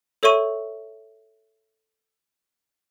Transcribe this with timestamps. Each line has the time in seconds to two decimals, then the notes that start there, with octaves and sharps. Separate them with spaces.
0.23 A4 C#5 E5 C#6 D#7